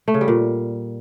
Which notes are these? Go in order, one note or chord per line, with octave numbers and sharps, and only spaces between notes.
A3
C#3
G3
A#2